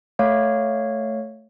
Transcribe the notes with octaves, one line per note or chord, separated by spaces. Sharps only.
A3 C#5 F5